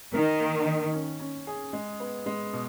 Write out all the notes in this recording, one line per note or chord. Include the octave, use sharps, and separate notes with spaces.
D#3 A#4
A#3
D#4
C#4
C#4
G#4
G#3
B3
G#3
B2